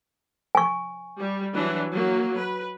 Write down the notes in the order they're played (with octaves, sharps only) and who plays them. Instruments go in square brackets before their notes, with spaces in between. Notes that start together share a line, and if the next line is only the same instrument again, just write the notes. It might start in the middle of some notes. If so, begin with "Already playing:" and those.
[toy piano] G#5 C#6
[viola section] G3
E3 F#3 D4
F#3 A#3
B4